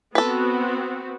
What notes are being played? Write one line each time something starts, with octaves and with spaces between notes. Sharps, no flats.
B3 C4 F#4 A4 B4